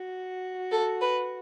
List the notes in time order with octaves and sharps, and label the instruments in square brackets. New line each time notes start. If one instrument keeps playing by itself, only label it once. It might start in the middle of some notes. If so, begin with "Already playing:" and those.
Already playing: [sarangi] F#4
[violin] A4
B4